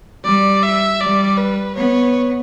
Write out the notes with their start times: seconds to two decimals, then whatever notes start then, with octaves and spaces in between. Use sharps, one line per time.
0.24 G3 D5
0.63 E5
1.01 G3 D5
1.38 B4
1.76 B3 C#5